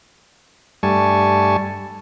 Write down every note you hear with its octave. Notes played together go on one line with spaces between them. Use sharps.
G2 G3 A3 G#5 A5 C#6